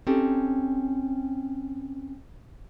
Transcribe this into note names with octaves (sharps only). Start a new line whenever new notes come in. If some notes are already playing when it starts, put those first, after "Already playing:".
C4 C#4 D#4 G4 A4